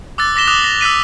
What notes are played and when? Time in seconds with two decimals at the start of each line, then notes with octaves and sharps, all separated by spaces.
0.18 D6 E6 F#6 A6
0.36 D6 A#6 B6 E7 G7
0.48 D6 D#6 F#6 F7 G7
0.64 A#6
0.81 E6 F#6 B6 D#7